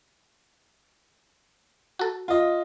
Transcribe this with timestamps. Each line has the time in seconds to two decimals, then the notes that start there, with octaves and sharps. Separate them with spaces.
1.99 F#4 A4
2.28 F4 D#5